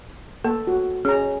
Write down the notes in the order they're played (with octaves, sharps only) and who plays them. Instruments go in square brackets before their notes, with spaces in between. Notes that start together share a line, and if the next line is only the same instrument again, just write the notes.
[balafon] A#3 [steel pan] A4
[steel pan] F#4
[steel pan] C#4 A#5 [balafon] G#4